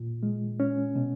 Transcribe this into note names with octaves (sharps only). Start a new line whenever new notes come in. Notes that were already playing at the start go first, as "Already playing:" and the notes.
Already playing: A#2 F4
G#3
C#4
B2